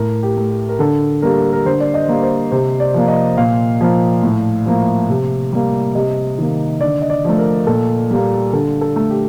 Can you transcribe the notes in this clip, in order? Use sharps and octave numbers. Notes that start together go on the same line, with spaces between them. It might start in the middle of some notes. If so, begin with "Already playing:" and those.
Already playing: A2 A#4
G4
A3
G4
A#4
D3 A4
G3 A#3 A#4
A#4
D3 C5
D5
D#5
G3 A#3
C5
C3 C5
D5
F3 A#3
D#5
A#2 F5
F3 A#3
A2
F3 A#3
C3
G3 A#3
C3 D#5
D#3 A#3
D3 D5
D#5
D5
F3 A3
A#4
A#2 A4
G3 A#3
D3 A4
A4
A3
G4